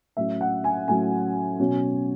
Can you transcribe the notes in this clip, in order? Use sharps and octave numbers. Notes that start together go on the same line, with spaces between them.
A2 F#3 C#4 E5
F#5
G#5
A2 F#3 C#4 G#5
B2 F#3 C#4